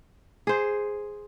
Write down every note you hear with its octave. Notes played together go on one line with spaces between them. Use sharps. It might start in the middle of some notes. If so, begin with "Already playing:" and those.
G#4 C5